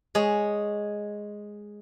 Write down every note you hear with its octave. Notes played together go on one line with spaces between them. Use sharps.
G#3 G#4 C#5